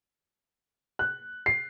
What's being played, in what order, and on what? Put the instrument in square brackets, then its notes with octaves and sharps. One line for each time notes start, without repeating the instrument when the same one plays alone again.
[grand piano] F#6
C7